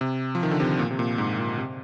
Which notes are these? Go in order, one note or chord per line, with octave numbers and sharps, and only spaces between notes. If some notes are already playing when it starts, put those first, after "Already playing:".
C3
F3
D#3
D3
C3
A#2
C3
A#2
G#2
A#2
C3